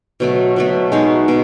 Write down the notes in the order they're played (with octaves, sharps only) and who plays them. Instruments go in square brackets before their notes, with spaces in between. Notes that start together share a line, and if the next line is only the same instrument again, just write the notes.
[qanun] B2 F#3 A3
B2 F#3 A3
B2 G#3 D#4 F#4
B2 G#3